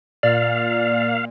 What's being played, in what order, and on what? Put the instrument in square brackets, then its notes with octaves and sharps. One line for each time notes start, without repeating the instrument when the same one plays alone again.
[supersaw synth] A#2 [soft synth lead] D5 [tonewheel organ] F5